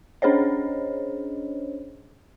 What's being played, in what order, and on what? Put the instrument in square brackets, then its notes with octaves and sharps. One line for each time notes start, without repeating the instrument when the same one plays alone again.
[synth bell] C#4 D4 G#4 C5 C#5 D#5